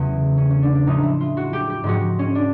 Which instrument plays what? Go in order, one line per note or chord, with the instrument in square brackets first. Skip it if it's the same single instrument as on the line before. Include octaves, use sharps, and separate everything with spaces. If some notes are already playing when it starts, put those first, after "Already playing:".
Already playing: [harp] E2 C#3 F#3 A3 C#4
C#4
C#4
D4
D4
A2 F3 G#3 D#4
E4
F4
F#4
G4
G4
G#2 F3 G#3 F#4
C#4
D4